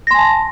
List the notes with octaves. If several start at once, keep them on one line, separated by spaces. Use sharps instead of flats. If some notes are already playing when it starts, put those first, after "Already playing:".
G#5 A5 C6 A#6